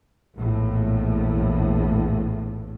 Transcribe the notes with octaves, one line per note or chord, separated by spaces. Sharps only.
A#1 E2 A2